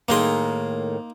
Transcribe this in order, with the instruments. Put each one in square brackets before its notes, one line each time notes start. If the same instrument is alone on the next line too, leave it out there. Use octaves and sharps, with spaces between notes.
[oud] A2 D#3 G#4 [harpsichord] A#3 D#4 C6